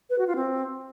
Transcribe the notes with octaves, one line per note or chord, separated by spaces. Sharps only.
B4
F#4
F4
C4